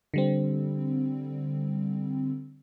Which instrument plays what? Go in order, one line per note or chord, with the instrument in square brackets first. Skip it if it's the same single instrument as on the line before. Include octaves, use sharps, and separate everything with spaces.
[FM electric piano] D3 G3 C4